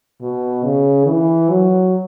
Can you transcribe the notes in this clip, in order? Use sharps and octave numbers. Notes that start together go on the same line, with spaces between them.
B2
C#3
E3
F#3